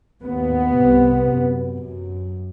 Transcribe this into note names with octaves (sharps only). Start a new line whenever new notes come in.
D#2 B3
C3
C2
F#2
F#2